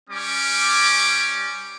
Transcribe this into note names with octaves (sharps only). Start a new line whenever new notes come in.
G3 C#4 D6